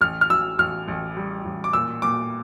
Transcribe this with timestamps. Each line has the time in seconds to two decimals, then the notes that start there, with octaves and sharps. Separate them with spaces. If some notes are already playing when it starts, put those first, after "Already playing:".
0.01 A1 F6
0.21 F6
0.30 A1 E6
0.58 A1 F6
0.88 A1
1.17 G3
1.45 A1
1.64 D6
1.73 A#2 E6
2.02 A#2 D6